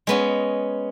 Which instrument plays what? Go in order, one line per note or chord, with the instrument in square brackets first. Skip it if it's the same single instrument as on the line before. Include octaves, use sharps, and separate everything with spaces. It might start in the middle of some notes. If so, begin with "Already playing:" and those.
[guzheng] G#3 B3 C#4